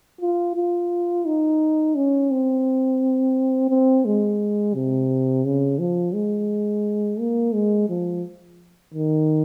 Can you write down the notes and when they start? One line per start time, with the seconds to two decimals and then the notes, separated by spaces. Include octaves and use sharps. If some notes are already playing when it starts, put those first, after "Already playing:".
0.21 F4
0.56 F4
1.26 D#4
1.95 C#4
2.31 C4
3.70 C4
4.05 G#3
4.74 C3
5.45 C#3
5.79 F3
6.14 G#3
7.19 A#3
7.54 G#3
7.89 F3
8.94 D#3